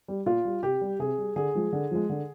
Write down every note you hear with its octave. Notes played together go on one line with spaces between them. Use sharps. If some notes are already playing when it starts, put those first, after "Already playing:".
G3
A#2 F4
G3
C3 G4
G3
C3 G#4
G3
D3 G#4
F3 G#3
D3
F3 G#3
D3